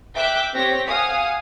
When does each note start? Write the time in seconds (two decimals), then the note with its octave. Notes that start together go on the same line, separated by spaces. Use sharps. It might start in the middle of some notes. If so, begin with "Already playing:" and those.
0.16 E5 G5 D6 F#6
0.54 C4 G4 C#5 A#6 B6
0.89 F5 F#5 G#5 D#6